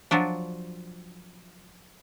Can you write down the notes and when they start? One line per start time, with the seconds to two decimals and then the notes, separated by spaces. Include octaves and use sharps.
0.11 F3 F#3 D4